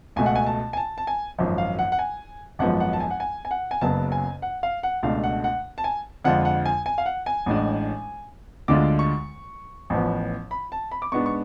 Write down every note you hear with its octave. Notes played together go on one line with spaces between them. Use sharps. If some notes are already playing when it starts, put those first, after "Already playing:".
C#2 B2 A3 G#5
F#5
G#5
A5
G#5
A5
A5
G#5
G#1 F#2 F3
F5
F#5
F#5
G#5
G#1 F#2 F3 G#3 B3 F#5
F#5
A5
G#5
F#5
G#5
G#5
F#5
G#5
F#1 F#2 C#3 F#3 B3 A5
G#5
F#5
F5
F#5
C#2 B2 A3 D4 F5
F#5
F#5
A5
G#5
F2 D3 G#3 D4 F4 F#5
F#5
G#5
G#5
F5
F#5
G#5
A1 A2 G#3 D4
D2 D3 G#3 D4 F4 D6
C#6
A1 A2 F3 B3
B5
A5
B5
D6
G#2 G#3 B3 D4 C#6
C#6